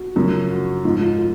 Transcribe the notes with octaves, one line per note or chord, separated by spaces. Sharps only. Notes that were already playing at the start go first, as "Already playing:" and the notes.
Already playing: F#4
F#2 C#3 F3
F#4
G#2 F3 F4
F4
F4